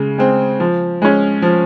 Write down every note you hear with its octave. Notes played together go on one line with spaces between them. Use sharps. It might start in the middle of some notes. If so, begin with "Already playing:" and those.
Already playing: C#3 G#3
G#3 C4
F3
G#3 C#4
F3